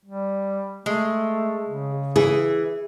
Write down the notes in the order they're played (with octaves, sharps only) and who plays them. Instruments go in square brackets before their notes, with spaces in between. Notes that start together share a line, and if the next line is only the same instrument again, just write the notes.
[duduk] G3
[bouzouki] G#3 [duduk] A3
[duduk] C#3
[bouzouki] E3 [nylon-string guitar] G#4